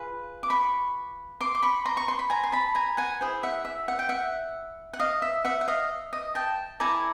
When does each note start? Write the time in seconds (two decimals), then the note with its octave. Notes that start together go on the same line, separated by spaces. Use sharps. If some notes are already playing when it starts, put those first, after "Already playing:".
Already playing: F4 G#4 B4
0.43 D6
0.50 B5 C#6
1.41 C6 D6
1.55 D6
1.63 B5 C#6
1.85 A#5 C6
1.97 C#6
2.08 C6
2.19 B5
2.30 G#5 A#5
2.44 C6
2.52 A5 B5
2.75 G#5 A#5
2.97 F#5 G#5
3.21 E4 G#4 C5
3.43 E5 F#5
3.65 E5
3.88 F#5
3.99 G5
4.09 E5 F#5
4.93 F#5
5.00 D#5 F5
5.22 E5
5.45 E5 F#5
5.61 F#5
5.68 D#5 F5
6.13 D#5
6.35 G5 A5
6.80 E4 A4 D5 G#5 A#5